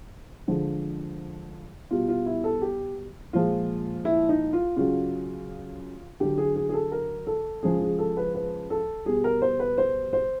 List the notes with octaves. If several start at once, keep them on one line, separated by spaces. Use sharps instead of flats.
D3 F3 G#3
B2 G3 F4
F4
E4
A4
G4
A#2 F3 G#3 F4
E4
D#4
F4
C#3 F#3 F4
D3 F#3 G4
G#4
G#4
G#4
A4
A#4
A4
C#3 F3 G#3 G#4
G#4
A4
B4
B4
A4
B2 G3 G#4
A#4
C5
B4
C5
C5